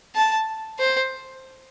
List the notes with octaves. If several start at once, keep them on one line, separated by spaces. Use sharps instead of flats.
A5
C5